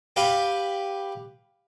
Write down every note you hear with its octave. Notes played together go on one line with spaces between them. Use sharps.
G4 B4 F5 B5